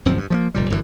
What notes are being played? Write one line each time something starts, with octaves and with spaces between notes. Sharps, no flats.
D1 F#2 F3 C4
G2
F3 F#3 A#3
F1 A#2 G3
G1 F#2 C3 E3